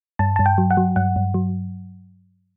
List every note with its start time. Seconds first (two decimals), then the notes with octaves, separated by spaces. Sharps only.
0.19 G2 A5
0.36 G2 A5
0.46 G5
0.58 F#3
0.71 F#5
0.77 F#3
0.96 G2 F#5
1.16 G2
1.34 F#3